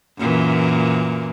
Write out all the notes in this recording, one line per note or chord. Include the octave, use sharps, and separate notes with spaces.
F#2 A#2 E3